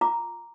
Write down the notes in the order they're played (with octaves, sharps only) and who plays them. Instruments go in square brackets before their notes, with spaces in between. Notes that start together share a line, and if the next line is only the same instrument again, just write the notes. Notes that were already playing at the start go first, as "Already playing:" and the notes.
[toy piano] F4 A#5 D6